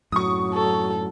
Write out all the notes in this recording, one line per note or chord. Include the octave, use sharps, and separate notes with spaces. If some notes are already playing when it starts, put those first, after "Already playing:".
F#2 A2 F#3 C#6 D#6
A4